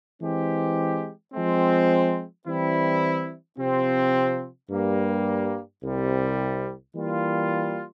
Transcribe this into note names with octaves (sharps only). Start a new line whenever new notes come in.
E3 G#3 C4 G4
F3 G#3 C4
E3 G3 C4 E4
C3 F3 C4
G2 G3 A#3
C2 C3 G3
E3 G3 A#3 F4